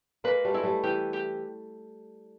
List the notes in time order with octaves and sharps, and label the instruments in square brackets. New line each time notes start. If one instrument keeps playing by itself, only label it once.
[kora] G#3 A#3 [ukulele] B4
[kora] G3 A3
[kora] G#3 [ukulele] E4
[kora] G3 A3
[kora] E3 [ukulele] G4
[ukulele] G4